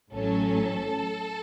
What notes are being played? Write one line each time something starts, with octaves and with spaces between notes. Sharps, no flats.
A1 A2 F#3 C#4 A4